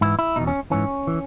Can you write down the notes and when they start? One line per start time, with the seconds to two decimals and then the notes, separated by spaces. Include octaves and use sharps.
0.01 G#2 E3 E4
0.19 E4
0.36 E2 B2 D#4
0.47 C#4
0.71 G#2 E3 C#4
1.07 E3